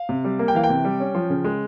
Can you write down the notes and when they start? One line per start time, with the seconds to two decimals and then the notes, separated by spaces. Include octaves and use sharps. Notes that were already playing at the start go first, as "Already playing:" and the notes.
Already playing: F5
0.09 C3
0.24 G3
0.39 A#3
0.48 G5
0.55 E3 F5
0.64 G5
0.70 C3
0.85 G3
1.00 C#4
1.15 F3
1.30 C#3
1.44 G#3